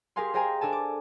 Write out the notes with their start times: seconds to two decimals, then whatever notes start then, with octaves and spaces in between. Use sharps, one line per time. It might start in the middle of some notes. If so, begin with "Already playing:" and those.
0.16 G4 G#4 A#4 F5 G#5 C6
0.34 G#4 C5 D#5 G5 G#5 A#5
0.61 D4 A4 G#5 A5
0.72 D6